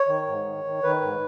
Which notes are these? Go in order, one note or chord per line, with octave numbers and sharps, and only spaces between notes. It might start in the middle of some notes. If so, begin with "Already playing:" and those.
Already playing: C#5
D#3
G#2
D#3
D#3
D#3 B4
G#2